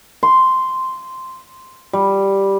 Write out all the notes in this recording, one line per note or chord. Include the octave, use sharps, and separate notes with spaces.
C6
G3